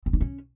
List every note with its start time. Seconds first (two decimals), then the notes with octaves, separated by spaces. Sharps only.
0.06 C4
0.13 D4
0.21 C#4